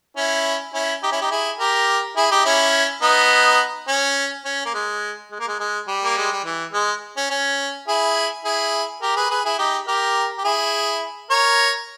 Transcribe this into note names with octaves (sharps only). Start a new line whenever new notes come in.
C#4 E4
C#4 E4
D#4 G4
C#4 E4
D#4 G4
E4 G#4
G4 A#4
E4 G#4
D#4 G4
C#4 E4
B3 D#4
C#4
C#4
A#3
G#3
G#3
A#3
G#3
G#3
G3
A#3
G#3
G3
E3
G#3
C#4
C#4
E4 G#4
E4 G#4
G4 A#4
G#4 B4
G#4 B4
E4 G#4
D#4 G4
G4 A#4
G4
E4 G#4
A#4 C#5